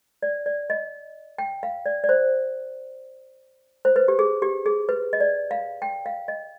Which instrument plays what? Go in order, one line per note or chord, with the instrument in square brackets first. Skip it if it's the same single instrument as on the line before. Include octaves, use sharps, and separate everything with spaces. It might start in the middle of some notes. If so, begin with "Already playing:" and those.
[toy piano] D5
D5
D#5
G5
F5
D5
D5
C5
C5
B4
G4
G#4
G4
G#4
B4
D#5
D5
F5
G5
F5
D#5